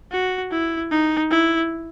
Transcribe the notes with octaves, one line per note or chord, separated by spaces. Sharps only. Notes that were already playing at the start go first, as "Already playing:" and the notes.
F#4
E4
D#4
E4